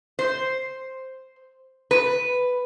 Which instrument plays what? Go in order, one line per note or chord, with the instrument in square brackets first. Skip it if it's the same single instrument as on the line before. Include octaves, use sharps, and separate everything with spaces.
[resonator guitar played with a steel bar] C5
B4